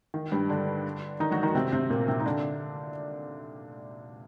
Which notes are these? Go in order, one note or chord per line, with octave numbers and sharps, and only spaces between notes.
D#3
G2 G3
D3 D4
D#3 D#4
F#3 F#4
D#3 D#4
C3 C4
C3 C4
A#2 A#3
C3 C4
D#4
D3 D4